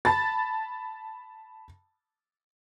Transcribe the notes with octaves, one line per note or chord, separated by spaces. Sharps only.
A5 B5 A6